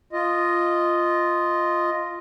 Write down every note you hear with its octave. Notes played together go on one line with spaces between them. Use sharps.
F4 D#5